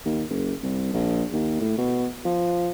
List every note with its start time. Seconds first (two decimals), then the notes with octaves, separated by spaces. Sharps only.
0.05 D#2
0.29 F#1
0.63 C2
0.93 A#1
1.32 D#2
1.61 A2
1.78 B2
2.25 F3